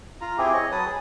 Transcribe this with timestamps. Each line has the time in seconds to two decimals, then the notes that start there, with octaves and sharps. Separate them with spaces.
0.21 F4 A#5
0.38 C4 E4 G4 G#4
0.53 C#5 D#5
0.72 F#3 B4 A5 D#6
0.86 G#4